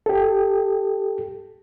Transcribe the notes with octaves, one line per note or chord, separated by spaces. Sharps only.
G4 A4